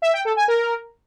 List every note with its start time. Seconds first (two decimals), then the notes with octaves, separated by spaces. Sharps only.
0.02 E5
0.13 G5
0.25 A4
0.36 G#5
0.48 A#4